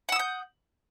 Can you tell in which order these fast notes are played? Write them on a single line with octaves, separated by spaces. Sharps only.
F#5 E6 D#6 G6